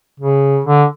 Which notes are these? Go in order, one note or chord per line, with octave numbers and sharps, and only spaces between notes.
C#3
D3